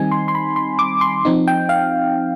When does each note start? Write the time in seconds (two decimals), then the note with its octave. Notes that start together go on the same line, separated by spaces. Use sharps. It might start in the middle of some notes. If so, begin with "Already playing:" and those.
Already playing: D#3 G3 C4 D#4 G#5
0.12 C6
0.28 C6
0.35 B5
0.56 C6
0.79 D6
1.01 C6
1.25 F3 C4 D#4
1.48 G5
1.69 F5